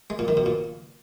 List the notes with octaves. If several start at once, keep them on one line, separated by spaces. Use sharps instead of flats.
G#3
A#2
D#3
B2
A#2